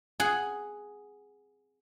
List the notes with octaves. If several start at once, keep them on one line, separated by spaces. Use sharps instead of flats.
G#4 F#5